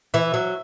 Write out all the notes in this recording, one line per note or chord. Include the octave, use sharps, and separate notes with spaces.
E3 E5
F#3